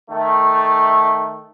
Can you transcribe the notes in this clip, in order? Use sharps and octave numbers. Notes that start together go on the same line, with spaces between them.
D#3 A3